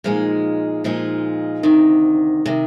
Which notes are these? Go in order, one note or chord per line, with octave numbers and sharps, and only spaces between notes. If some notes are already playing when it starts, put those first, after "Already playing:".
A#2 F3 G#3 D#4
A#2 F3 G#3 D#4
D2 C3 D#3
C3 D#3